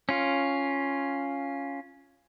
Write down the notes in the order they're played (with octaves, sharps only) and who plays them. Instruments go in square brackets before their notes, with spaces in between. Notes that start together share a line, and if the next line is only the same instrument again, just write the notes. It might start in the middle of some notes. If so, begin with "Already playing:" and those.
[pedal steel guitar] C#4 F4